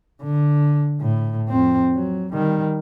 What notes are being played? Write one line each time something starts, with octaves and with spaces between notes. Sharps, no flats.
D3
A2
F2 C4
F#3
D#3 G3